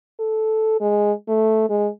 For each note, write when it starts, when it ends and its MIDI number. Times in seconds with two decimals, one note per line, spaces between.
0.19 0.77 69
0.81 1.12 56
1.28 1.69 57
1.70 1.88 56